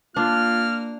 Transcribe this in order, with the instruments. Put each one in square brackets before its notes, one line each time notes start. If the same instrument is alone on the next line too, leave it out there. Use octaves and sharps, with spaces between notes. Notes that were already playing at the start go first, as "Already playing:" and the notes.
[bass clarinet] A#3 [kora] D4 [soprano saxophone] F4 [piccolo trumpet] F6